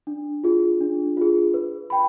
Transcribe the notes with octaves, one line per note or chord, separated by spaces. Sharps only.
D4
F4 G#4
D4
F4 G#4
B4
G5 B5